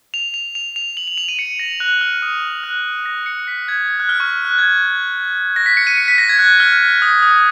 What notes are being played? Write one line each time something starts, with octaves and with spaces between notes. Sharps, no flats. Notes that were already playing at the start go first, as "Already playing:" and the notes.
F7
F7
F7
F7
F#7
F#7
F7
D#7
C#7
A#6
F#6
F6
D#6
F#6
A#6
C#7
B6
G#6
G#6
F#6
F6
C#6
F#6
G#6
A#6
B6
C#7
D#7
C#7
B6
A#6
G#6
F#6
F6
D#6
D#6